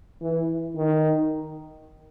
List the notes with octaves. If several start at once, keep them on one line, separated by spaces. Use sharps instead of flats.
E3
D#3